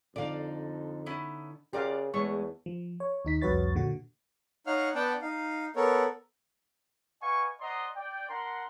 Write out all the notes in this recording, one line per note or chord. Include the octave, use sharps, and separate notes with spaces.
F2 D3 D4 D#4 D5 F5
B3 C#4 E4
C#3 F4 G4 A#4 D5 F5 F#5
E2 G#3 A3 C#5 C#6
F3
C#5
D#2 D#4 B6
C2 F2 F#4 B4 C#5 A6
A#2 D3 F#4
D#4 C#5 F5 F#5 F6
B3 D4 F#5 G5 A5
D#4 F5
B3 A4 A#4 C#5
B4 D#5 F5 F#5 G#5 C#6
C5 D5 D#5 F#5 A#5 C6
D5 G5
D4 A#4 F#5 A#5 C6